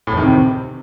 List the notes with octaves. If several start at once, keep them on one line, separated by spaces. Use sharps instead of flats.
A2
E2
D#3
C3